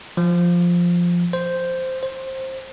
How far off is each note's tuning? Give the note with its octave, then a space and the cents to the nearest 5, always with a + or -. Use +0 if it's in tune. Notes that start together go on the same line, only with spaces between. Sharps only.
F3 +0
C5 -5
C5 +15